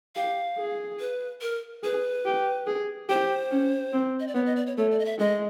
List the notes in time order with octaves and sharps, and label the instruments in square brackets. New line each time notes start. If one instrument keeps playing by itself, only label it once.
[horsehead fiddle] G4 [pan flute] F5
[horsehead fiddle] G#4
[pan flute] B4
A#4
[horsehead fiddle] G#4 [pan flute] B4
[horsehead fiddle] G4
G#4
[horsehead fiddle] G4 [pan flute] C5
[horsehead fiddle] C#4
C4
[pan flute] D#5
D5
[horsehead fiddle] B3 [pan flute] C#5
[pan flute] D#5
D5
C#5
[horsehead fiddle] A3 [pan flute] C#5
[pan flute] D5
D#5
E5
[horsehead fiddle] G#3 [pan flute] D#5